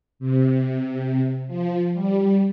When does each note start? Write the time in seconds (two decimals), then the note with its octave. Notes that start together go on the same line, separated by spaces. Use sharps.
0.19 C3
1.48 F3
1.93 G3